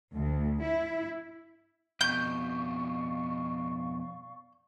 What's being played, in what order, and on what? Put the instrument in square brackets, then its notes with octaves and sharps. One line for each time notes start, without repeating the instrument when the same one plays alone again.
[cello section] D2
E4
[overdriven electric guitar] F2 B2 [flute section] D5 F5 C#6 [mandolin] G6